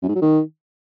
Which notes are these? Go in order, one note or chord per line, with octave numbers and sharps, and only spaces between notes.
F#2
G#2
F#3
D#3